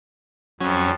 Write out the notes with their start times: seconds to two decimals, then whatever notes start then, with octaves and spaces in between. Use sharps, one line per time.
0.61 F2 F#3 C#4